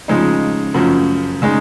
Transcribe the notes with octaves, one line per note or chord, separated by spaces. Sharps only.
C#3 F3 G#3 D#4
F#2 C#3 F3
C#3 G#3 D#4